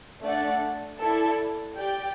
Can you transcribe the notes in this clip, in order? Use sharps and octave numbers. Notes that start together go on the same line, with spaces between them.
A3 D4 A4 D5 F#5
E4 A4 D5 A5
G4 D5 G5